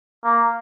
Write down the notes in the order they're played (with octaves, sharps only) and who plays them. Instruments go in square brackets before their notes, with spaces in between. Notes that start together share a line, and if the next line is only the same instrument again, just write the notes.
[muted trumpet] A#3